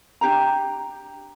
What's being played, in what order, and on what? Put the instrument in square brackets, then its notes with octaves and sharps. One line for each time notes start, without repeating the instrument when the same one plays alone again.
[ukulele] D4 G4 G5 A#5